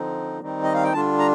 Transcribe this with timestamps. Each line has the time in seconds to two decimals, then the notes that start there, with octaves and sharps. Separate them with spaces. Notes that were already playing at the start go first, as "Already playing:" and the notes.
Already playing: D3 F3 C4 D#4
0.41 D#3 G3 C4 D#4
0.63 D#5
0.74 F5
0.83 G5
0.93 D3 G3 D4 F4 A5
1.19 A#5